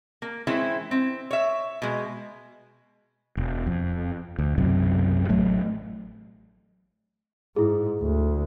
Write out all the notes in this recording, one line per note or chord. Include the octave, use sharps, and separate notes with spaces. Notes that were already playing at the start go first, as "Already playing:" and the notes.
A#3
E3 G#3 C4 C#4 E4
C4
C#5 E5
B2 G#3
E1
F2
D2
B1 F#2 C3
A1 F#3 A3
G#2 E4 G#4
D2